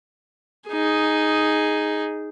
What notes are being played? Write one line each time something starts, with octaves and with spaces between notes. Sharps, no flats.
D#4 G#4